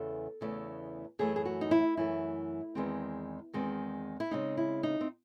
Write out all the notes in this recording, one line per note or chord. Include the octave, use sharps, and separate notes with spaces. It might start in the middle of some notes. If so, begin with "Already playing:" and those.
Already playing: E2 C#3 E3 A3 A4
E2 C#3 E3 A3
F#2 E3 A3 G#4
G#4
F#4
D#4
E4
F#2 E3 A3 E4
E2 D#3 G#3 C4
E2 D#3 G#3 C4
E4
C#3 G#3 C4 D#4
E4
D#4
C4